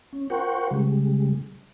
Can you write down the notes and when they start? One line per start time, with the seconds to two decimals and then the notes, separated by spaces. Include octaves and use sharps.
0.13 C#4
0.30 F4 A#4 C5 F#5 G5 C#6
0.71 C#3 G3 G#3